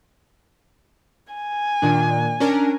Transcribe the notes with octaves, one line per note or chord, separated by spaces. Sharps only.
G#5
A#2 D#3 D4
C#4 D4 A#4